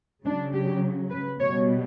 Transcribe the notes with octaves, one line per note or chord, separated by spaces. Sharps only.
C#3 F#3 D4
G4
B4
B2 G3 C#5